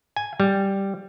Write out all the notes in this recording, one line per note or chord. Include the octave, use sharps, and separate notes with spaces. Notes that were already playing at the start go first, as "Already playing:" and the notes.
G#5
G3